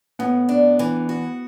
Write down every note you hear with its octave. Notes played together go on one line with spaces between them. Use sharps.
A2 B3
D4
E3
F#4